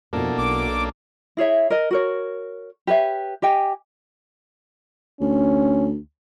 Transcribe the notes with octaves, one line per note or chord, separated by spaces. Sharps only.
F2 B2 A#3 D4 E4 A4 A#4
B1 D6
E4 G#4 C#5 E5
A#4 D#5
F#4 A#4 C#5
G4 B4 C#5 E5
G4 D#5 G5 G#5
D2 C#4